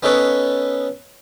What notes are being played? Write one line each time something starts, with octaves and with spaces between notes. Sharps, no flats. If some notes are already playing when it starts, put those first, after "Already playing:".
B3 C#4 D#4 A4 B4 C#5